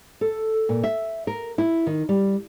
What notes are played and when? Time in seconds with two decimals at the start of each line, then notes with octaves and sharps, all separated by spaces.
0.21 A4
0.69 A#2
0.84 E5
1.27 A#4
1.58 E4
1.87 D#3
2.09 G3